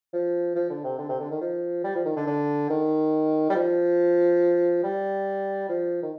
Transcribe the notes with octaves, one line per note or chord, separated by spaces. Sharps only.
F3
F3
D3
C3
D3
C3
D3
D#3
F3
G3
F3
D#3
D3
D3
D#3
G3
F3
G3
F3
D#3